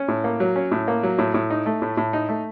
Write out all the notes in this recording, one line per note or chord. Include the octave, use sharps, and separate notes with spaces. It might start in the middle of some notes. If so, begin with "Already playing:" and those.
Already playing: C#4
A2
A#3
F#3
C#4
A2
A#3
F#3
A2
A2
D#4
A3
A2
A2
D#4
A3